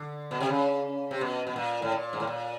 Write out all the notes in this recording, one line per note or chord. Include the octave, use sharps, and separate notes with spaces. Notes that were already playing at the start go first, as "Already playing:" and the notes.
Already playing: D3
B2
C3
C#3
C3
B2
B2
A#2
A2
A#2
G#2
A2
A#2